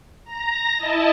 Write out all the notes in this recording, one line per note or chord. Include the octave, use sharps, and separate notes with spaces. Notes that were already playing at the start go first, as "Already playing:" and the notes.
A#5 A#6
E4 D#5 A5